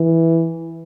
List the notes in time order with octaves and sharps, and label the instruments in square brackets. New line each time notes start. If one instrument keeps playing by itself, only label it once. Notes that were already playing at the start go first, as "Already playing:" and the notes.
Already playing: [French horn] E3